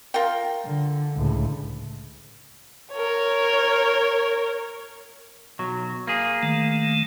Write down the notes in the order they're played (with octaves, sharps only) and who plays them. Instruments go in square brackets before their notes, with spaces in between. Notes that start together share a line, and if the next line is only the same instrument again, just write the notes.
[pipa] F4 A#4 G5
[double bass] D3
C#2 A2
[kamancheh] A#4 C#5
[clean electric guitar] B1 F#3
A#3 G#4
[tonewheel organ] D#3 A3